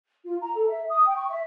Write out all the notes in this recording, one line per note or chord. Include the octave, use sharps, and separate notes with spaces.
F4
A#5
A4
E5
D#6
G5
C#6
E5